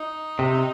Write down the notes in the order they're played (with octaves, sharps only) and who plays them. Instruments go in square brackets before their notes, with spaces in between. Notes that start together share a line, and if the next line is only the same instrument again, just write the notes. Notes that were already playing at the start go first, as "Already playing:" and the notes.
Already playing: [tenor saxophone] D#4
[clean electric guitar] C3